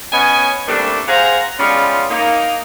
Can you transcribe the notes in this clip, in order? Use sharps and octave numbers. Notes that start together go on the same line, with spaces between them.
B3 C#4 D#5 G#5
C3 G3 A3 A#3 D4
G#4 C5 F5 F#5 G#5 A#5
G3 G#3 B3 C#4 F4
A#3 D#4